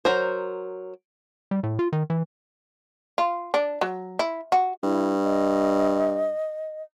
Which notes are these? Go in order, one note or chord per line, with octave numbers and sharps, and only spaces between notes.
F#3 A#4 C5
G3
A2
F4
D#3
E3
F4
D4
F#3
E4
F#4
G2 E4
D#5